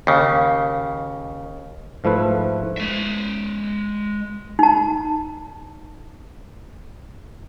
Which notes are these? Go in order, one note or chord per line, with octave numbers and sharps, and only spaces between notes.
D#2 C#3
G#2 F3 A3 E4 B4
G#3 E5
D#4 A5